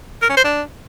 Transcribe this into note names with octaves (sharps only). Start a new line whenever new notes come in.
A#4
C#4
C5
D4